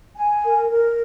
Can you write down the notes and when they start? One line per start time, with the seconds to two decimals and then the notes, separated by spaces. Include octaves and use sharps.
0.16 G#5
0.43 A#4
0.70 A#4